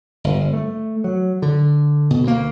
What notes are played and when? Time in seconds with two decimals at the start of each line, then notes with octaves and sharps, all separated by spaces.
0.24 G1
0.53 A3
1.04 F#3
1.42 D3
2.10 B2
2.23 D2 A#3